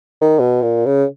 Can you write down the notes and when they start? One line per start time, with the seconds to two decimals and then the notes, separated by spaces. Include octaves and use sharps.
0.22 D#3
0.39 B2
0.62 A#2
0.86 C#3